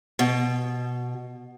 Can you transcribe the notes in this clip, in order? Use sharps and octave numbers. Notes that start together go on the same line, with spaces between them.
B2